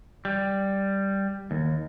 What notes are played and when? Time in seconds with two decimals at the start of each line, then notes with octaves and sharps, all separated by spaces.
0.25 G3
1.51 D#2